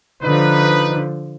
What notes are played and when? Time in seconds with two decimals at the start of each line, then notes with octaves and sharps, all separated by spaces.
0.23 D3 F3 D#4 B4